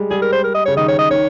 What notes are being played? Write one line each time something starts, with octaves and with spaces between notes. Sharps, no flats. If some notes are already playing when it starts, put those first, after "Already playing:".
Already playing: G3 G#3
G3 G#4
A#4
C5
A#4
D#5
C#3 C#5
D#3 D#5
C#5
D#5
D#3 C#5